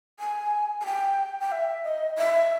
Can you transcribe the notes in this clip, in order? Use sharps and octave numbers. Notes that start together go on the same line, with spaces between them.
G#5
G#5
G5
G5
E5
D#5
E5